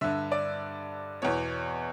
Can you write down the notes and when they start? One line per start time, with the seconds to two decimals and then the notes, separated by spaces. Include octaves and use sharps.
0.01 G2 D3 E5
0.32 D5
1.22 E2 B2 C#5